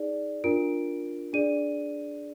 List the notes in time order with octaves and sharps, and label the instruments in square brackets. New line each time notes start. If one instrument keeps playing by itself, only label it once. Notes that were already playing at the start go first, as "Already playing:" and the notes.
Already playing: [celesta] D#4 G#4 D5
D4 F4 A#4 D7
D4 G#4 D5 D#7